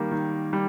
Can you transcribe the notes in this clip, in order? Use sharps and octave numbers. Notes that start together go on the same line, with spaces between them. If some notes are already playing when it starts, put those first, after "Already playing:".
Already playing: D#3 G3 A#3
D#3
G3